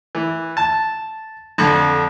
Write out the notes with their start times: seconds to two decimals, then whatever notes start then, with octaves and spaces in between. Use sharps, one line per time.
0.15 E3
0.57 A5
1.58 F2 D3